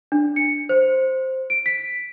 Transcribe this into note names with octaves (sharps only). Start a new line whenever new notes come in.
D4
C#7
C5
D7
B6